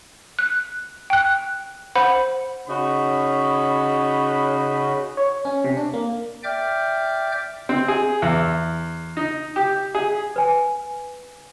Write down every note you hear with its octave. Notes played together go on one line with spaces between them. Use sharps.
F#6
G5 F#6
C5 F#5 B5
C#3 C#4 D#4 F#4 B5
C#5
C#4
C3
D4
A#3
D5 E5 G5 D6 F6 G6
C4
G#4
E2
D#4
G4
G#4
B4 G#5